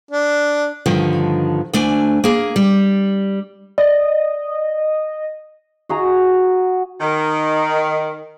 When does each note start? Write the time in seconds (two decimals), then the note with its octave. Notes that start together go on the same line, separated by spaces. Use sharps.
0.11 D4
0.86 G2 D3 D#3 F3
1.73 D2 A3 D4 G#5
2.24 A#3 G#4
2.56 G3
3.78 D5 D#5
5.89 F#4 G#4 A#5
7.00 D#3